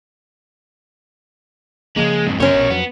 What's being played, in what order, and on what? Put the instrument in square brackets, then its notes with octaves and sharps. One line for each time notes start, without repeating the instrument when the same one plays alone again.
[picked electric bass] C#3 F3 A#3 [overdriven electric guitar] G#3
[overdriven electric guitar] F2 G#2
[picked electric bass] F#2 C#3 B3 [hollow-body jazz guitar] C#4 C5 [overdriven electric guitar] A#4 C#5
[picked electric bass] A#1 B2
[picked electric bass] F2 F#3 [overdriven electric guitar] B3